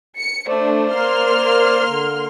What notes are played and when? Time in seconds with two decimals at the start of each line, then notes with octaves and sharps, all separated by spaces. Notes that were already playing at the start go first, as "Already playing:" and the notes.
0.17 C#7
0.48 A3 D4 C5 D5
0.92 A#3 C6 F6
1.88 D3